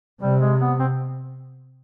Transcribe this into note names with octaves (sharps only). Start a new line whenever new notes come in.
C3 G3
G#3
B3
C4